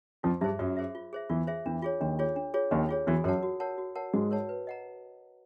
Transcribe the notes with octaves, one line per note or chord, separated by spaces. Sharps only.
F2 F3 F4
G2 G3 G#4 C5 E5
F#2 F#3 F4
G#4 C5 E5
F4
G#4 C5 E5
E2 E3 F4
G#4 C5 E5
E2 E3 D4
F4 G#4 C#5
D#2 D#3 D4
F4 G#4 C#5
D4
F4 G#4 C#5
D#2 D#3 D4
F4 G#4 C#5
E2 E3 F#4
F#2 F#3 A#4 C#5 F#5 A5
F#4
A#4 C#5 F#5 A5
F#4
A#4 C#5 F#5 A5
G#2 G#3 F#4
A#4 C#5 F#5 A5
B4
D#5 F#5 A#5